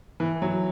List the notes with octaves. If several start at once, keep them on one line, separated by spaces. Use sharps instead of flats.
E3
F#3